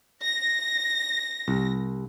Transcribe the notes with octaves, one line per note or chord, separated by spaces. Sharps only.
A#6
C2